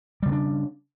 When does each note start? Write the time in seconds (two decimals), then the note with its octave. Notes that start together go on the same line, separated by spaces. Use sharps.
0.23 G3
0.26 C#3
0.29 B3
0.32 D4